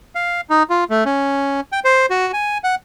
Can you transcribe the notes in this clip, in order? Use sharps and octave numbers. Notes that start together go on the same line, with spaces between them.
F5
D#4
F4
A3
C#4
G5
C5
F#4
G#5
F#5